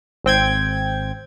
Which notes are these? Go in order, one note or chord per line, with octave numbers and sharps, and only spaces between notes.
G#1 C4 G5 G#6